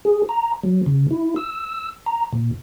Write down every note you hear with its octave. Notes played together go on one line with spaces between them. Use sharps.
G#4
A#5
F#3
C#3
E4
E6
A#5
A#2